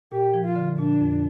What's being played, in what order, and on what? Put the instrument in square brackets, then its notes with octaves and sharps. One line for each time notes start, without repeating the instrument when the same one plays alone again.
[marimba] A#2 [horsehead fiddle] G4
[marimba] F3
[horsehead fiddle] F4
[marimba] D3
[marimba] A#2 [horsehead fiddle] D4
[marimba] F2